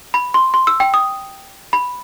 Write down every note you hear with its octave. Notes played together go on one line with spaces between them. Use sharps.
B5
C6
C6
E6
G5
D#6
B5